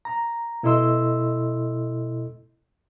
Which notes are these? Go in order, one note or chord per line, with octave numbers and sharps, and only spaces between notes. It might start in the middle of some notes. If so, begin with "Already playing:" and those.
A#5
B2 E4 A4 D#5 C6 E6